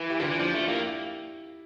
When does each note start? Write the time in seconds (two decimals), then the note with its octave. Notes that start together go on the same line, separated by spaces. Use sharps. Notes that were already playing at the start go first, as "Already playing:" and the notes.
Already playing: E3
0.10 E4 G4
0.20 D3 D4 F4
0.30 E3
0.39 F3 D4 F4
0.54 A3
0.68 A#3 E4 G4